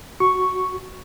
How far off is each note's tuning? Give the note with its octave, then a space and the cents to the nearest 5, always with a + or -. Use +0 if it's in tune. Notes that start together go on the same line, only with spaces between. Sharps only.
F#4 +5 C#6 +0